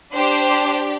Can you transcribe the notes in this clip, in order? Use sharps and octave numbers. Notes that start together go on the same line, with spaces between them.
D4 G4 C5